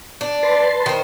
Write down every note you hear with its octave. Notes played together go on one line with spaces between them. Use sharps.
D4
B4 A5 C6
D#3 C5